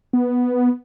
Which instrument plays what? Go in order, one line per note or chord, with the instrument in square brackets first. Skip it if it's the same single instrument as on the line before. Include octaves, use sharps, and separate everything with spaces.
[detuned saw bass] B3